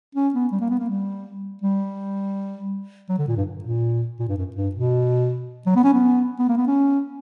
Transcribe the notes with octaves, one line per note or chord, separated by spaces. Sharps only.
C#4
B3
G3
A#3
B3
A#3
G3
G3
F#3
D3
A#2
G2
A#2
A#2
G2
F#2
G2
B2
F#3
B3
C#4
B3
B3
A#3
B3
C#4